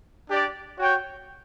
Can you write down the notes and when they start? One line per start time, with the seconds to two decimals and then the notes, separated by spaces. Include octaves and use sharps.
0.29 D4 G4 D5
0.78 F#4 C#5 G5